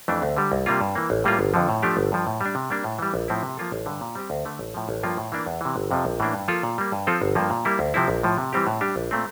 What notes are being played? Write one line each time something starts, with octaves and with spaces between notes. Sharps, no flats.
F2 E3 A3 D4
D2
D3 G3
C2
C3 G3 A#3 F4
G2
E3 A#3
A1
A2 G3 A#3 F4
G1
F2 D3 F3
A2
F3 A3 D4 G4
G1
G2 F3
A2
G3 D4
C3
G3 A#3 D4
A2
E3 G3
A#1
A2 F3 C4 E4
C3
F3 A#3 F4 A4
A1
G2 D3
A#2
G3 C4 G4
D2
D3 A3
A1
A2 F3
A1
G2 F3 A#3 F4
A2
E3 A#3 D4
E2
C3 E3
G1
F2 C3 F3
A#1
A2 E3 A#3 D4
G2
F3 A#3 F4 A4
A#2
G3 A#3
G2
F3 C4 F4 A4
G1
G2 F3 A#3
A#2
G3 A#3 E4
D2
C3 F3 C4 E4
A#1
A2 F3
C3
E3 G3 C4 G4
A2
G3 D4 G4
A#1
A#2 A3 C4